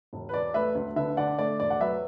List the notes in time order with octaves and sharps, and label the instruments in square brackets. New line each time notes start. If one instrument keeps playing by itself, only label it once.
[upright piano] E1
B4
E1 D5
A3 B4 E5
D2
D3 B4 E5
D3 D5 F#5
A3 D5
E1 D5
F#5
F#3 B4 E5